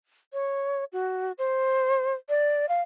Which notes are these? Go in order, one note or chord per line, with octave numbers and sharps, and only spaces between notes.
C#5
F#4
C5
D5
F5